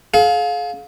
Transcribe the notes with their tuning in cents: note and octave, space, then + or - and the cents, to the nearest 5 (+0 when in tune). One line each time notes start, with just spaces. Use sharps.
G#4 +45 F5 +20